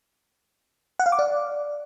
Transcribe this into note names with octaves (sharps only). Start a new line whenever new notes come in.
F#5
F5
D6
D5